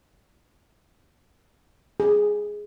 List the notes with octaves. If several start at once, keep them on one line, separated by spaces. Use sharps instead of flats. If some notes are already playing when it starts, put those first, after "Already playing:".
G#4